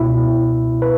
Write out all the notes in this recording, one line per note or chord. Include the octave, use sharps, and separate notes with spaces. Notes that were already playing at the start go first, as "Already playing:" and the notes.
Already playing: C#2 B2 E4
B4